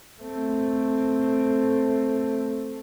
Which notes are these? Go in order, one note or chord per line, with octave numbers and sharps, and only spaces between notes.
A3 C4